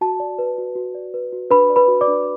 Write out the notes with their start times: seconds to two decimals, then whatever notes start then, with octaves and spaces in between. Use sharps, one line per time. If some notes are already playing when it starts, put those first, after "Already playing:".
0.01 F#4 A5
0.20 D5
0.39 B4
0.58 F#4
0.76 F#4
0.95 D5
1.14 B4
1.32 F#4
1.50 D4 B4 B5
1.70 D5
1.76 B4 B5
1.88 F#4
2.01 D5 D6
2.07 D4